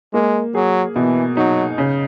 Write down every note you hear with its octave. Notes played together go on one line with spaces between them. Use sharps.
G#3 A#3
F#3 G#4
B2 E3
F#3 D#4
C#3